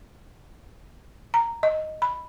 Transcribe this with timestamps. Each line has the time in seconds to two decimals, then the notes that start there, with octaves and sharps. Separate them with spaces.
1.34 A#5
1.63 D#5
2.02 B5